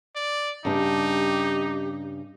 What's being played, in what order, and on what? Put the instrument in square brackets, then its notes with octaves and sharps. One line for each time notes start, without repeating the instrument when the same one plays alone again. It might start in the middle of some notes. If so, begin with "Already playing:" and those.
[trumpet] D5
[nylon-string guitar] G2 C#3 D4 [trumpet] D#4 [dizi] G4